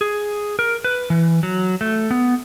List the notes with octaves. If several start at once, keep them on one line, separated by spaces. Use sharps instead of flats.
G#4
A#4
B4
E3
F#3
A3
B3